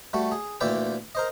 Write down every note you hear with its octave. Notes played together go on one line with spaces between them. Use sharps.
G3 A3 F#4
G#4
D2 A#2 E3 D5 E5 G5
A#4 C5 D#5